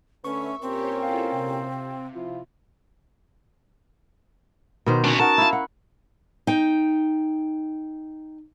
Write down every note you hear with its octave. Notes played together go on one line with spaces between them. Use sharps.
D3 A3 C#4 B4 E5 C#6
A#2 C4 C#4 G4 A#4 C5 C#5
E4 F4 A4 F5 G5
C3
F3 E4 F4
B2 D#3 C5
C#4 D4 F#4
D#4 F#4 A#4 A5
E4 F5
F#5
D#4 G5